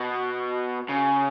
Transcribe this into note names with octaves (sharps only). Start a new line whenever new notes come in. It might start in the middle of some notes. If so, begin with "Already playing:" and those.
Already playing: B2
C#3